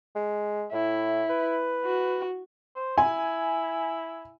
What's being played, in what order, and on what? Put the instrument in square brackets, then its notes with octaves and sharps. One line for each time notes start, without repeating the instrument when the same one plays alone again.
[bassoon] G#3
[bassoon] A2 [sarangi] E4
[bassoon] B4
[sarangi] F#4
[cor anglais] C5
[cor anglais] E4 [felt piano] G#5